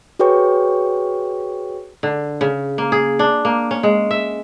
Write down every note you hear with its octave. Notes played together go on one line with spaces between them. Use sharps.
F#4 G#4 B4 C#5 G5 C#6
D3
C#3
A#3
G#4
D4
A#3
C#4
G#3
E5